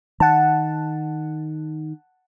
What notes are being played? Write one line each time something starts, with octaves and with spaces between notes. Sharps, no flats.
D#3 F#5 A5